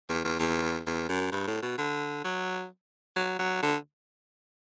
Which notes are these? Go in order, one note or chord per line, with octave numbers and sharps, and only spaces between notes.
E2
E2
E2
E2
F#2
G2
A2
B2
D3
F#3
F#3
F#3
D3